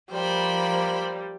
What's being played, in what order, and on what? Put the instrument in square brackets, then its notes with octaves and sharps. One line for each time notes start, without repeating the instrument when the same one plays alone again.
[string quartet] F3 A#3 [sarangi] G3 [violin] C5 B5